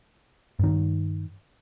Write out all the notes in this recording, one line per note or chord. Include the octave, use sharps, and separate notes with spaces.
G2 D#3